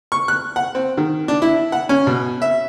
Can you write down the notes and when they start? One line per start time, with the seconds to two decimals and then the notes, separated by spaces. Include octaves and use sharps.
0.12 C#6
0.28 F#6
0.56 F#5
0.75 C4
0.97 D#3
1.28 D4
1.42 E4
1.72 F#5
1.89 C#4
2.07 B2
2.42 E5